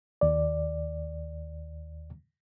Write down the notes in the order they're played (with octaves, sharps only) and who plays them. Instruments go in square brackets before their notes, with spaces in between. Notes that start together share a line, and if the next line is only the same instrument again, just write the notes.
[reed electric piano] D#2 D5